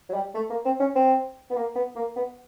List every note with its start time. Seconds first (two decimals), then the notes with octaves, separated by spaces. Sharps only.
0.09 F#3
0.14 G3
0.34 A3
0.50 A#3
0.65 C4
0.80 C#4
0.95 C4
1.50 B3
1.56 A#3
1.76 B3
1.96 A#3
2.16 B3